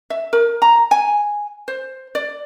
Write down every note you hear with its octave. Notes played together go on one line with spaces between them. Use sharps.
E5
A#4
A#5
G#5
C5
D5